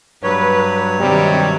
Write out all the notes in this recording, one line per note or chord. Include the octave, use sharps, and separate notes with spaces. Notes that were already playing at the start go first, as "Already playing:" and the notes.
G2 F#3 B4 C#5
C3 D#3 G3